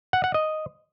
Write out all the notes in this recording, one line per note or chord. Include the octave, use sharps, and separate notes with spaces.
F#5
F#5
D#5